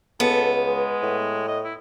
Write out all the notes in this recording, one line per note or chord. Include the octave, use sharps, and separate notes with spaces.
C#2 B3 A4
G#3
A2
D#5
E4